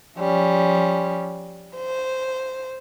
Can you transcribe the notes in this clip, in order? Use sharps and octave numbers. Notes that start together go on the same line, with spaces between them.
F3 G3 C#4
C5